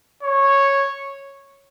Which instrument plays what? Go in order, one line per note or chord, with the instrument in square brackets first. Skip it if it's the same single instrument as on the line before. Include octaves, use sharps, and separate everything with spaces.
[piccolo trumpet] C#5